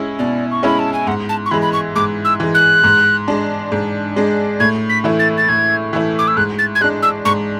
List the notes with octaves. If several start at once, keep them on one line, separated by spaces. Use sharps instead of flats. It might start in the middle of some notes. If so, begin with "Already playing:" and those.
Already playing: G#3 C#4 E4
B2 D5
C#6
G#3 C#4 E4 B5
A5
G#5
G#2 F#5
A5
C#6
E3 G#3 B5
B5
C#6
G#2 D6
E6
E3 G#3
F#6
G#2
G#3 D4
G#2
G#3 D4
A2 G#6
B6
E3 A3 E4
A6
A6
A2 G#6
E3 A3 E4
D6
E6
G#2 F#6
A6
G#6
G#3 D4 F#6
E6
G#2 C#6